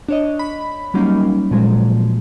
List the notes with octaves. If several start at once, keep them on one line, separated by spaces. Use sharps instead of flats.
D4 C#5 D#5
B5
F#3 G3 A#3 C#4 D#4
A#2 F3 F#3 G#3